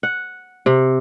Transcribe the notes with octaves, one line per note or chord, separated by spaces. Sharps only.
F#5
C3